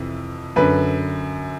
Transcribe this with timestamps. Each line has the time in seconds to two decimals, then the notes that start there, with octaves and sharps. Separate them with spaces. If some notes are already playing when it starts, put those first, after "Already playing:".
Already playing: F2 C3 E3
0.56 F#2 D3 B4